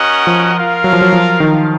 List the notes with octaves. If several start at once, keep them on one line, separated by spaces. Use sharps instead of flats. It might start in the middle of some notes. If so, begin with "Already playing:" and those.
Already playing: C#4 F#4 A#4 D#5 F#5
F3
F4 A#4 F5
F#3
F3
F#3
F3
D#3